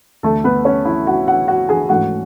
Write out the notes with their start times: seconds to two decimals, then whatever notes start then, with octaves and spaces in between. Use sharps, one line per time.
0.23 D2 D3 A3 D4 A4
0.44 B3 B4
0.65 C#4 C#5
0.85 E4 E5
1.07 F#4 F#5
1.27 F#4 F#5
1.48 F#4 F#5
1.69 G#4 G#5
1.89 G#2 E3 A3 C#4 F#4 F#5